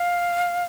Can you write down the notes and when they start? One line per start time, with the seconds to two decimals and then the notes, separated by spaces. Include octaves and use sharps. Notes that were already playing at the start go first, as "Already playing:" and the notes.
Already playing: F5